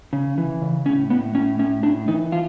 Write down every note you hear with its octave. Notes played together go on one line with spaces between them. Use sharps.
C#3
E3
C#3
A2 C#4
A2 B3
A2 C#4
A2 C#4
A2 D4
E3 D#4
F4